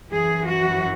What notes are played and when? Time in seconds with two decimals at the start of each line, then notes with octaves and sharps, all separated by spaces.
0.11 F#2 E3 G#4
0.46 F#4